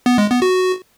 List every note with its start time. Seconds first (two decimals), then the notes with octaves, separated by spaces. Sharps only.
0.06 B3
0.18 G#3
0.30 B3
0.42 F#4